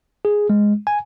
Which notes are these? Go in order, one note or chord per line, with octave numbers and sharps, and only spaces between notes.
G#4
G#3
G#5